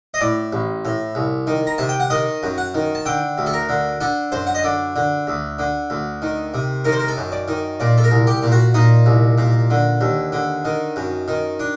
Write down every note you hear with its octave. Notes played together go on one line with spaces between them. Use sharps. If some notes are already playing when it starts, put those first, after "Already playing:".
D#5
A2 D5
A1
A2
C2
D#3
A#5
C3 A5
G5
F#5
D#3 D#5
F#2
F#5
D#3
A5
D3 G5
D2
A4
A#4
D3
D3 A4
F#2 C5
F#5
D#5
D3 D5
D3
D2
D3
D2
D#3
C3
D#3 A#4
C5
A#4
A4
F#2
D5
D#3
A#2 D5
A4
A#4
C2
G4
A#2
F#4
A#2 D#4
C2
A#2
D3
D#2
D3
D#3
F#2
D#3
D4